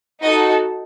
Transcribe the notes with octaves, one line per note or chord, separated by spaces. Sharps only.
D#4 F#4 A4 D#5